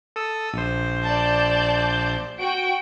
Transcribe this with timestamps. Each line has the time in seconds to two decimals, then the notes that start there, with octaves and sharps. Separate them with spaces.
0.16 A4 D#6 E6
0.53 A#1 C5
1.03 D5 A5 G6
2.38 F#4 G5 D7